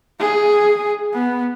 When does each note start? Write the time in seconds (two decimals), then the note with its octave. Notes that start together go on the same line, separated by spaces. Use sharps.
0.20 G#4
1.13 B3